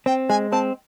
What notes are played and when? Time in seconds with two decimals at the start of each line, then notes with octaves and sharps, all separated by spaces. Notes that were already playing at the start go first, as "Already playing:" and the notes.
0.06 C4 G5
0.29 G#3 G#5
0.52 C4 A5